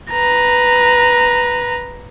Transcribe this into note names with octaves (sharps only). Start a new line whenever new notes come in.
B4 A#5